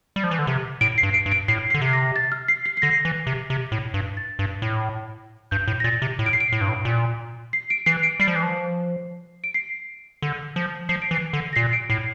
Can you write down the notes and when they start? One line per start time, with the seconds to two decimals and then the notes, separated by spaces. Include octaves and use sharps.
0.16 G3
0.24 F3
0.31 E3
0.39 D3
0.47 C3
0.81 A2 D7
0.98 C7
1.03 G2
1.14 D7
1.26 G2
1.32 D7
1.48 A2 C7
1.70 D3 C7
1.82 C3
1.93 A#6
2.16 A6
2.32 F6
2.48 C7
2.66 C7
2.77 C7
2.82 D3 A#6
3.05 E3
3.27 C3
3.50 C3
3.72 A2
3.94 G2
4.17 A6
4.39 G2
4.62 A2
5.51 G2 G6
5.68 A2
5.80 A#6
5.84 A#2 A6
6.02 C3
6.19 A2
6.26 D7
6.33 C7
6.40 D7
6.52 A2
6.61 G2
6.69 A2
6.85 A#2
7.53 C7
7.70 D7
7.86 E3 C7
8.03 D7
8.20 G3 C7
8.28 F3
8.35 E3
8.43 F3
9.44 D7
9.54 C7
10.22 D3
10.56 F3
10.89 F3 C7
11.02 D7
11.11 E3
11.15 C7
11.33 D3
11.53 A#6
11.56 A#2 C7
11.73 D7
11.90 A2 C7